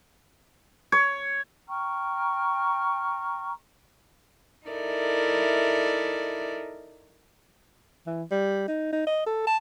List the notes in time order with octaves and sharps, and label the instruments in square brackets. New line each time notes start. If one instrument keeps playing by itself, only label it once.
[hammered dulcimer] C#5
[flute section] G5 A#5 C#6 F6
[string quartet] D#4 E4 A4 A#4 D5 E5
[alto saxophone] E3
G3
D#4
D#4
D#5
A4
A5